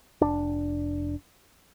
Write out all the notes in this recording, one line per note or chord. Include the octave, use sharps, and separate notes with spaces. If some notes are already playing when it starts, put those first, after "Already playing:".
F1 D4